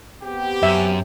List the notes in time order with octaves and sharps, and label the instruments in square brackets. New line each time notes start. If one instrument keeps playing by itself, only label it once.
[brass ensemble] B3 C4 G4
[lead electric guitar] F#2 [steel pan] E5